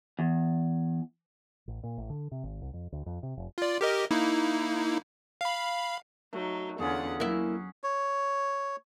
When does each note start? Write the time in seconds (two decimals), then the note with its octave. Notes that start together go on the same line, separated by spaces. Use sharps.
0.19 E2
1.68 A1
1.83 A#2
1.98 A1
2.10 D3
2.32 C3
2.43 G#1
2.62 C2
2.73 F2
2.92 D2
3.06 F2
3.23 C3
3.37 F1
3.58 F4 D5
3.81 G4 A#4 D#5
4.11 A#3 D#4 E4
5.41 F5 B5
6.33 F#3 A3 D#4
6.80 E2 D3 C#4 F4 G#4 F#5
7.20 F#3 A#3 E4 F#5
7.84 C#5